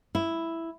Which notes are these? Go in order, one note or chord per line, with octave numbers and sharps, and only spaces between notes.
E4